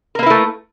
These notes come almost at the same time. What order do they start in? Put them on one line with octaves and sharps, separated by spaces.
A#4 A#3 B4 E4 A3